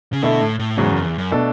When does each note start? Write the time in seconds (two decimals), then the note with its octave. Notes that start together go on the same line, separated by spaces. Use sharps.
0.13 C#3
0.22 B2 D3 A3 E4 A4
0.41 A2
0.59 A2
0.77 E2 G#2 C#3 F#3
0.91 F#2
1.05 E2
1.18 F#2
1.31 B2 A3 D4 A4